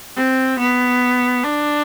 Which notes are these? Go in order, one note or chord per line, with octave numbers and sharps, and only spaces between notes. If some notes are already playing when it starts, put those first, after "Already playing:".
C4
B3
D4